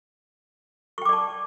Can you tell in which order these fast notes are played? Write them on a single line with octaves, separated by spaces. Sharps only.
C#6 G5 D6 D5 A5